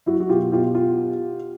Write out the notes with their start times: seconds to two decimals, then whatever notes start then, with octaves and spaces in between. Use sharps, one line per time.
0.06 F#1 E4 F#4
0.20 F#4
0.29 B2 F4 G4
0.52 B2 F4 G4
0.75 F4 G4